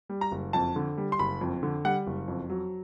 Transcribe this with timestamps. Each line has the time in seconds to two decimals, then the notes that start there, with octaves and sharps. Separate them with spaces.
0.09 G3
0.21 A#5
0.32 F#1
0.53 F2 A5
0.76 D3
0.98 G3
1.12 C6
1.19 F#1 B5
1.41 F2
1.63 D3
1.85 G3 F#5
2.07 F#1
2.28 F2
2.50 F#3